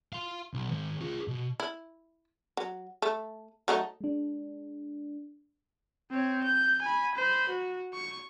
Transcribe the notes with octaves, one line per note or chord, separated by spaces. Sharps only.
F5 C6
B1
D#3 G#3
F4 G#4
B2
E4
F#3
A3
F#3 A3 D#4
G#3 D4
C4 C#5
G6
G#5 B5
C5 B5
F#4
C#6